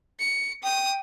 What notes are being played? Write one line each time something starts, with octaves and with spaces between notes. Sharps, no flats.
C#7
G5 D#6